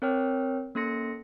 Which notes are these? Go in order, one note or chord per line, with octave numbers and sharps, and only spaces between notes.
C4 A#4 C#5 G5 F6
A#3 C#4 A4 C6 A#6 C#7